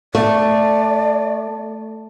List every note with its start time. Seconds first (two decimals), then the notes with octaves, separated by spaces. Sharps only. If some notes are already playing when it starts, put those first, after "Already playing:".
0.15 A3 D5